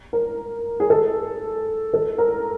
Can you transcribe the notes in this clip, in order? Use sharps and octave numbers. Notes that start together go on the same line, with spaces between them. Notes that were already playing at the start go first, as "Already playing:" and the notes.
A#4
G#4
A4
A4
A#4